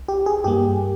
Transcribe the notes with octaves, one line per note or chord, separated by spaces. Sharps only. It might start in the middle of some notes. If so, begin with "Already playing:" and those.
Already playing: C2
G4
G#4
G2 G3 A#3 G4